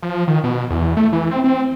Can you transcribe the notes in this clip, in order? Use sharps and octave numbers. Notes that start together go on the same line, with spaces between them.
F3
D#3
B2
E2
A3
E3
C4
C4